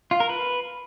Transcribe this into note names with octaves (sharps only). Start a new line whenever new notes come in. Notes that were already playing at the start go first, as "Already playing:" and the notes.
F4
A#4
B4